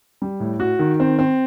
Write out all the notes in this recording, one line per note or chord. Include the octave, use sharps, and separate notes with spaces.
G3
A2
F#4
D#3
C4
C4